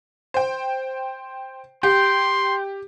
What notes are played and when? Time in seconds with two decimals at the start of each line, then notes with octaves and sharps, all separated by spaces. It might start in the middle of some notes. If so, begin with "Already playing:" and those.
0.34 C5 G5
1.83 G4 G5 C6